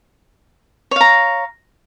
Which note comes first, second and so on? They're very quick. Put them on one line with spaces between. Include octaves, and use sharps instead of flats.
C#5 F5 A#5